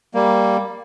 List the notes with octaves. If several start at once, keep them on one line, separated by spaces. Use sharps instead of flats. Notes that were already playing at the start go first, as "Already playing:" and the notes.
G3 A#3